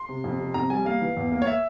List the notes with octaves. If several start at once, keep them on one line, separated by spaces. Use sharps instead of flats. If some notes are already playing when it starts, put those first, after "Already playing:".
Already playing: C6
C3
F2
C3
F2 A#5
G3 G#5
A#3 F5
E3
E2
A#3
C#5
E5